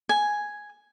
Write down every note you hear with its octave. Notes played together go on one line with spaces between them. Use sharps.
G#5